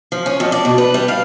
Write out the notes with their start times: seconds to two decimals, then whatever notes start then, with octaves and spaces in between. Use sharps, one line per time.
0.12 F3
0.26 C#4
0.40 F2
0.52 D5
0.65 B2
0.78 B4
0.94 G3
1.08 F5